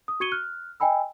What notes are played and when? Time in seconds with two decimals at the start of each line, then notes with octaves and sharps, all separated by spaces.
0.08 D#6
0.20 F#4 C#6 G#6 C#7 D#7 G7
0.32 F6 F#6
0.80 D#5 G5 G#5 B5 E6